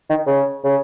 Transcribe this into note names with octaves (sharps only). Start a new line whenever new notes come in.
D#3
C#3
C#3